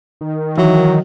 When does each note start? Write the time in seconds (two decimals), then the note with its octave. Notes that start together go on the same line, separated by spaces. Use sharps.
0.21 D#3
0.58 E3 F#3